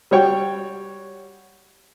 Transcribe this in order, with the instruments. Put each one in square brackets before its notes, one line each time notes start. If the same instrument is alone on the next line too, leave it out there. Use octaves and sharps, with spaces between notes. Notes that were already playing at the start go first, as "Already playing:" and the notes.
[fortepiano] G3 F#4 C#5 G5